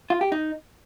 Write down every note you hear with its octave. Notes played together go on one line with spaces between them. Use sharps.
F4
G4
D#4